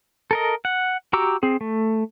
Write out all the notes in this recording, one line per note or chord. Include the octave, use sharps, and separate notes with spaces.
A4 A#4 D#5
F#5
F#4 G4 A#5 D6 E6
C4 G#4
A3